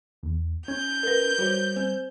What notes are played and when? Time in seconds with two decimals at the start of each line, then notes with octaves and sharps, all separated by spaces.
0.23 E2
0.68 C#4 G6 G#6
1.03 A#4 B4
1.38 G3 F#4 C5 C#5
1.76 C4 C5